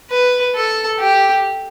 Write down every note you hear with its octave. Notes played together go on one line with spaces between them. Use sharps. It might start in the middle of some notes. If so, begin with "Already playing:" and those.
B4
A4
G4